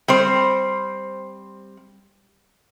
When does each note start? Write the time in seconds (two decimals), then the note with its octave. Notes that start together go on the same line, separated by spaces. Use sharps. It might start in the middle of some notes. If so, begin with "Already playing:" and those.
0.08 G3 C4 C5